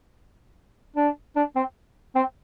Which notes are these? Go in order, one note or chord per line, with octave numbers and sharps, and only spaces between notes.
D4
D4
C4
C4